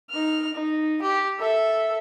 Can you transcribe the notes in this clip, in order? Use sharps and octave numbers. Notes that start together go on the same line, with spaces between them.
D#4 F6
D#4
G4
A4 E5